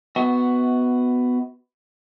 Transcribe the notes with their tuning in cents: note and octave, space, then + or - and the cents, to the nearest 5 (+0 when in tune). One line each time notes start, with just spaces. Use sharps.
B3 +10 F#4 +0 E5 -45